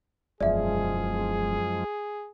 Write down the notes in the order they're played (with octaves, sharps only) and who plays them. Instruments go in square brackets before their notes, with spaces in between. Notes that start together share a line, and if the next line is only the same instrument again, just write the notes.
[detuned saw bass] E1 [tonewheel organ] F#2 F3 G#3 [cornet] G#4 [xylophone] D5 E5